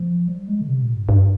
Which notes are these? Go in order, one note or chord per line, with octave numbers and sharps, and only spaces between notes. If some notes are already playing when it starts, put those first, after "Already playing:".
Already playing: F3
G3
G#3
D3
C3
A#2
G2
G2